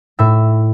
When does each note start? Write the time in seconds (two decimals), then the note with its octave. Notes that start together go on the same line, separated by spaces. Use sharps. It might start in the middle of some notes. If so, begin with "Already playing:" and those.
0.19 A2 E5